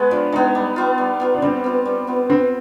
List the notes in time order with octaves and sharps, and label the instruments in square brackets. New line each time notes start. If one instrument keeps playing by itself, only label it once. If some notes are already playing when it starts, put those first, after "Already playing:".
Already playing: [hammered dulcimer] G#3 B3
[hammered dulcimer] F3 [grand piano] D4
[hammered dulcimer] G#3 B3 [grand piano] D#4
[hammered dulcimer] G3
B3 F4
G3
B3 F4
[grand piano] D4
[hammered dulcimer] G3 [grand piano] C4
[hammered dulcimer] B3 F4
G3
B3 F4
[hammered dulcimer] B3 [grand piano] C4